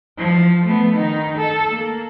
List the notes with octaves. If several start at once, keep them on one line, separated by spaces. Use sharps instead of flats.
F3
A3 B3
D#3 D#4
A4
A#3